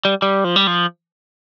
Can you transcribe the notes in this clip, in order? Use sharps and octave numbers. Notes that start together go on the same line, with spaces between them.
G3
G3
F3
G3
F3